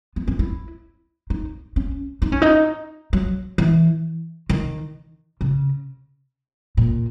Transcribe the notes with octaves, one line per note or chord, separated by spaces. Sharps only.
B3
C#4
E4
D#4
C#4
D#4
C#4
D#4
F#3
E3
D#3
C#3
A#2